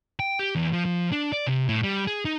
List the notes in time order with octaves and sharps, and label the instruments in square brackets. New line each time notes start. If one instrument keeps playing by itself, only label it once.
[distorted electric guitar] G5
G4
E2
F3
F3
D4
D5
C3
A2
G3
G#4
D#4